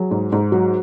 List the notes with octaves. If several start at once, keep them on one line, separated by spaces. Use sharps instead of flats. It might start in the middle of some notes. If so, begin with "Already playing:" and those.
Already playing: F#3 G#4
G#2
G#2
F#3 F#4